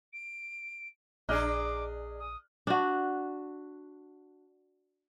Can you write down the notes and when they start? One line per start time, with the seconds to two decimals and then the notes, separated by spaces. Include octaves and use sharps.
0.13 D7
1.29 A#1 D4 G#4 D5 D#5 D6 F6 F#6
2.19 D#6
2.67 D4 F#4